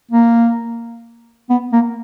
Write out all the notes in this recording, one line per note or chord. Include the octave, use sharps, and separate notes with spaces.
A#3
B3
A#3